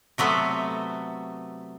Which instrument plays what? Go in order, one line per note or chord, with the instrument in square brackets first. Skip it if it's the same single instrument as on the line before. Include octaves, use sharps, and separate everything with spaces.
[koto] C3 F#3 A3 B3